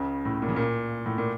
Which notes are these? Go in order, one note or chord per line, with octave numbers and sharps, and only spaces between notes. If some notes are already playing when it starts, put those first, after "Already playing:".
Already playing: C#2 C#3
A2
A#2
C#3
A#2
A2
A#2